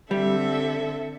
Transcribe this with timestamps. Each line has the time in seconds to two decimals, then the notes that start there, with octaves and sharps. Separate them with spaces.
0.11 D3 G3 C4 A4 E5